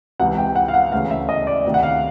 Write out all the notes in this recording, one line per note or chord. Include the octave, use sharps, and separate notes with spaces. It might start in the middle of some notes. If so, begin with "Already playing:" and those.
C#2 C3 E3 F#5
G5
F#5
F5
F#5
D2 C#3 E3 F5
E5
D#5
D5
D2 C3 D#3
F#5
F5